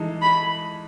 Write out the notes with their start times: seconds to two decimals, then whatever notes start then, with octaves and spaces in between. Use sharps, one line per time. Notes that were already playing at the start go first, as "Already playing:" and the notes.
Already playing: E3 G#3 D#4 A4
0.22 B5